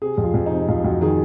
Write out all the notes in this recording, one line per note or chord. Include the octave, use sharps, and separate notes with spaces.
C3 G#4
F2
F4
F2
D#4
C3
F2 F4
F2 F#4
D#3 G#4